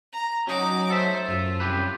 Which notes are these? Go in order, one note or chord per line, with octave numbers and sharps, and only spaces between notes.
A#5
F#3 C#4 D#4 F#4 D6
A4 C5 E5
F#2 F4
C2 G4 B4